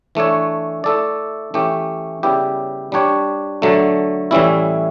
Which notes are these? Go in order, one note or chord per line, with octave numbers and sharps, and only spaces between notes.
E3 A3 D4 A4 C#5
A3 E4 A4 D5
E3 A3 C#4 G4
C#3 G3 B3 E4 G4
G3 D4 G4 C#5
D3 F#3 A3
A2 E3 G3 C#4 E4